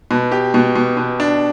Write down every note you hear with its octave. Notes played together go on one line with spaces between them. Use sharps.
B2
G4
B2
B2
B2
D4